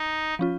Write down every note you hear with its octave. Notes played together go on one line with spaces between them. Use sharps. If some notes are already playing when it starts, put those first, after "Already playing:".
Already playing: D#4
F3 C#4 F4